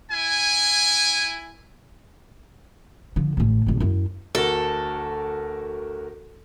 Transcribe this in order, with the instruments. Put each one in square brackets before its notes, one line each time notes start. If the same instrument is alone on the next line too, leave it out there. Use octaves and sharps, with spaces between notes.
[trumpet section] E4 G#5
[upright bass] D3 F3
A1 A2
E1 A#1
F#2 E4
[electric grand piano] D2 F#4 A#4 [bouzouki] A4